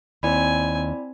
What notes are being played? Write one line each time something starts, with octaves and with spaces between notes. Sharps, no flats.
D#2 C4 E4 D5 G#5 B5